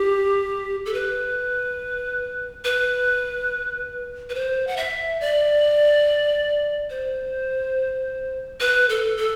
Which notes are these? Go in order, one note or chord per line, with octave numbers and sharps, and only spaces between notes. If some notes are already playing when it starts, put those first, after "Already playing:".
Already playing: G4
A4
B4
B4
B4
C5
F#5
E5
D5
C5
B4
A4
A4